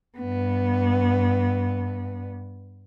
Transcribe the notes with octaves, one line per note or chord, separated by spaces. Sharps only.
G2 B3